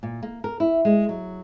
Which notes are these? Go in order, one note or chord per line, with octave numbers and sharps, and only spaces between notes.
A#2
A#3
A#4
E4
G#3
F#3